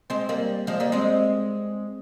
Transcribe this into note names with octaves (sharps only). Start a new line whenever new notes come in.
G#3 C4
G3 A#3
F3 G#3
G3 A#3
G#3 C4